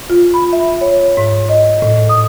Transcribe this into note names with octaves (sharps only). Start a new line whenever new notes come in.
F4
B5
E5
C#5
G#2
D#5
A2
D#6